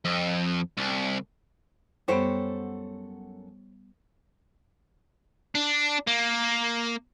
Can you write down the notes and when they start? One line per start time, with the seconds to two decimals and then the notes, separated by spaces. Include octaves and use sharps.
0.05 F2
0.77 C2
2.08 F#2 G3 B3 G4 A4 C5 C#5 F#5
5.55 D4
6.07 A#3